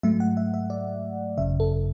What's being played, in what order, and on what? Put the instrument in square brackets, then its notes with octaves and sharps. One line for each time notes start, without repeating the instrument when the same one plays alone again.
[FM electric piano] G#2 F#3 A3 E5
F#5
E5
E5
D5
G#1 F#2 C#3 E5
A4